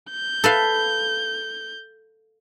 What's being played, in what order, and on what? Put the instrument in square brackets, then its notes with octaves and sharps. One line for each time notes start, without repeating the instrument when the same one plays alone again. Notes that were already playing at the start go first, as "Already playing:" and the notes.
[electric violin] G6
[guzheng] A4 B4 F5